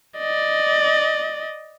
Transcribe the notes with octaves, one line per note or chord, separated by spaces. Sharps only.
D5 D#5